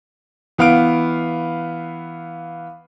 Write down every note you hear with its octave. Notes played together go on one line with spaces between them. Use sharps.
E3 B3 F5 F6 D7